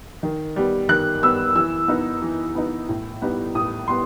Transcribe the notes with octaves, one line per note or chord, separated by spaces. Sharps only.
D#3
G3 B3
D#3 F#6
G3 B3 E6
E3 E6
B3 D#4
E3
B3 D#4
A2
G3 B3 D#4
A2 D#6
G3 B3 C6